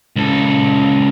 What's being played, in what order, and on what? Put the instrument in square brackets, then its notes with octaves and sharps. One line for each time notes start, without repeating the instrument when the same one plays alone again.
[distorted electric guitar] C#2 A4